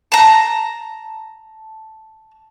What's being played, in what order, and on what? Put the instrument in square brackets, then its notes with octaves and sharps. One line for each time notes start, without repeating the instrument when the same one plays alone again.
[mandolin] A5 A#5